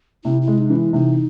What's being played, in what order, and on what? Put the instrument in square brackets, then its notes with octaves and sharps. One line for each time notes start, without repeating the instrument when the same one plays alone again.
[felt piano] C3 [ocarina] E4
[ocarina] E4
[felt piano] G#3
[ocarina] D#4
[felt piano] E3
[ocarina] E4
[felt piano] C3 [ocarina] D#4